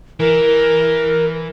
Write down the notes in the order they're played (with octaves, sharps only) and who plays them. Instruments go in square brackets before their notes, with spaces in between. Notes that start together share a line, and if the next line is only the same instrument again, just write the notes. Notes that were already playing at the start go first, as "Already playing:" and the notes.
[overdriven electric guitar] E3 [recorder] A#4